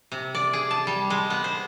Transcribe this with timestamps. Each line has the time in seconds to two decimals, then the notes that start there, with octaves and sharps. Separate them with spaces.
0.12 C3
0.35 D5
0.53 G#4
0.71 A5
0.87 G3
1.10 G#3
1.30 B3
1.44 C5